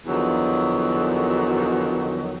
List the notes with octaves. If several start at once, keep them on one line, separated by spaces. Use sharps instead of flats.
E2 D3 D#3 F3 F#3